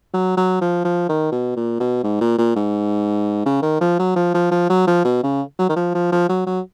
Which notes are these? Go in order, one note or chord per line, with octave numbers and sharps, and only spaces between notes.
F#3
F#3
F3
F3
D#3
B2
A#2
B2
G#2
A#2
A#2
G#2
C#3
D#3
F3
F#3
F3
F3
F3
F#3
F3
B2
C#3
F#3
D#3
F3
F3
F3
F#3
F#3